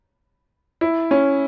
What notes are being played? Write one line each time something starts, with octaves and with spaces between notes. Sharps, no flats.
E4
C#4